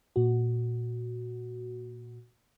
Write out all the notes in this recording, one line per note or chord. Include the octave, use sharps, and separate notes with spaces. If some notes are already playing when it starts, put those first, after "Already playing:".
A#2 F#4